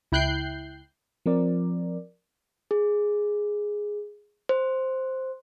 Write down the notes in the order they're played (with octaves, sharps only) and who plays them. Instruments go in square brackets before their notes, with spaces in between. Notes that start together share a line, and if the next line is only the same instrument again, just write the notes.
[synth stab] C#2 E4 G5 F#6 G6 C7
[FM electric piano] F3 C4 A#4 D5
[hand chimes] G#4
C5